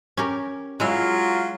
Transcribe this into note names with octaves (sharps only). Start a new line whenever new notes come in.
C#4 G4 A#4
F#3 G#3 E4 F4 F5